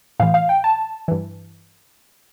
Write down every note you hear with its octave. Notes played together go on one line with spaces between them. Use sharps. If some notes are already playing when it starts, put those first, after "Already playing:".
A2 E3 F5
F5
G5
A5
G2 E3